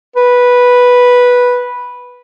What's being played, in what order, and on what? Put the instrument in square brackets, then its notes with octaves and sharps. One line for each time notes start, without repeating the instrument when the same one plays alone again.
[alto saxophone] B4